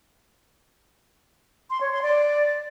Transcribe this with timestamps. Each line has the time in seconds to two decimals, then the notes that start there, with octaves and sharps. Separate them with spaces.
1.70 C6
1.81 C#5
1.92 C6
2.02 D5